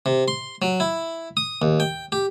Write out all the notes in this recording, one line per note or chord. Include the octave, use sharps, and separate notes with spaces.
C3
C6
F#3
E4
D#6
D#2
G5
G4